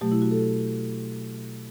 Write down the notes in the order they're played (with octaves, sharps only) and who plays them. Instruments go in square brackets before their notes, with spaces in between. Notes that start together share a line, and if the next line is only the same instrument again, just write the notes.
[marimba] B2 F#3 A3 G4
E4
F#4
A4